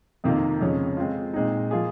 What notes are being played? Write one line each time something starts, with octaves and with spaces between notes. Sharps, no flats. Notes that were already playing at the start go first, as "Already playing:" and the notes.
F2 C3 D#3 A#3 F4
F2 C#3 F3 G#3 C#4
G#3 C4 F4
A#2 G#3 C4 D#4
F3 A#3 F4 G#4